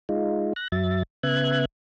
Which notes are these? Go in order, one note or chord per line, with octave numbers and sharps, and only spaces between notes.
G#3 D#4 F4
F#6 A#6
F#2 F#3 E5 A6
C#3 B3 E5 F#6 G#6